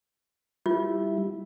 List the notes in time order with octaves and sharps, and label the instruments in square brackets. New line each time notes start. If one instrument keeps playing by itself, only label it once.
[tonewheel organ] G3 E4 [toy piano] F4